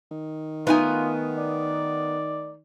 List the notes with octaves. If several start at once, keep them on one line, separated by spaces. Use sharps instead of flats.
D#3
A3 B3 D#4 F4 A#4 G#5
D5